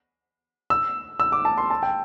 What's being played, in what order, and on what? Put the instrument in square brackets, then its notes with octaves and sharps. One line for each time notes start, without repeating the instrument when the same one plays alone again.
[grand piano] E6
E6
D6
A5
C6
A5
G5